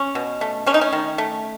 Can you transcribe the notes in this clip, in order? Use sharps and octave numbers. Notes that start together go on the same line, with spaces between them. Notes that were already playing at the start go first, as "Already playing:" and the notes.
Already playing: C#4
B2
A3
A3 C#4
D#4
C#4
D#3
A3